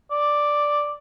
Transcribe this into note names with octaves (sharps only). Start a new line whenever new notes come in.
D5